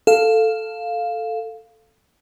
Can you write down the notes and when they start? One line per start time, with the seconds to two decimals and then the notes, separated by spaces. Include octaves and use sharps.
0.07 A4 F5